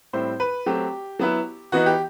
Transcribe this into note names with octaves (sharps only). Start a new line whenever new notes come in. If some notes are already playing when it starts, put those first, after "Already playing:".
A2 G3 C4 E4 C5
B4
F#3 A3 C4 G4
F#3 B3 E4
E3 B3 D#4 F#4
G4